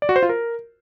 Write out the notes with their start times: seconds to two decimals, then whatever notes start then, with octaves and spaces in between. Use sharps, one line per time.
0.02 D5
0.09 F#4
0.16 C5
0.23 F4
0.29 A#4